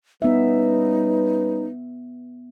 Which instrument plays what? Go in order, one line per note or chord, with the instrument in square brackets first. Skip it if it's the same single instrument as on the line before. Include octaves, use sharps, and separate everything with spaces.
[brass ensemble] G3 C#4 B4 [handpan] B3 E5 [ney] D#4